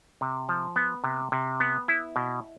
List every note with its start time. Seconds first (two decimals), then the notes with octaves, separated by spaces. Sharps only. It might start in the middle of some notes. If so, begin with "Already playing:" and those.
0.21 C3
0.49 F3
0.76 B3
1.04 C3
1.32 C3
1.60 B3
1.88 E4
2.16 B2